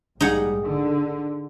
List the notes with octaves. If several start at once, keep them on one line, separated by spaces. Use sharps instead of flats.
A#1 G#2 G3 D#4 G#4 F#5
D3